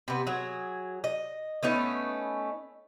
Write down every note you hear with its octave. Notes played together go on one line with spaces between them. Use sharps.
C3 B3
F#3 G#4
D#5
A3 B3 C#4 D#4